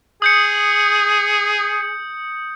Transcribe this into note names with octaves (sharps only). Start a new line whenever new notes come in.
G#4 D#6 G6 C#7